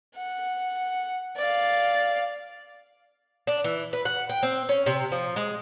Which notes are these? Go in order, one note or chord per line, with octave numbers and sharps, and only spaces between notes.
F#5
D5 F5
D4
E3
B4
F#5
G5
C4
C#4
C3
F3
G#3